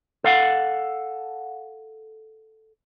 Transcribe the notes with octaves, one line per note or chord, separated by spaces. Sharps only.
A4 F5 F#5